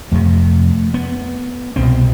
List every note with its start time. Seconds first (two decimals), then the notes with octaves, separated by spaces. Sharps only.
0.12 F2 C3 A3
0.94 B3
1.76 C2 B2 C4